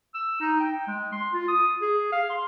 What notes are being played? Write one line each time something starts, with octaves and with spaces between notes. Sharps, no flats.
E6
D#4
G5
G#3
C6
F4
D#6
G#4
F5
C6